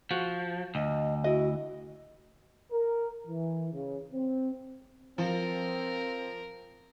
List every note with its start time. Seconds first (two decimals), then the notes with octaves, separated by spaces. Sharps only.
0.11 F3 F#4
0.75 D2 D#5
1.24 E4 F#4 D#5
2.71 A#4
3.26 E3
3.73 C#3
4.13 C4
5.18 F3 C4 A#4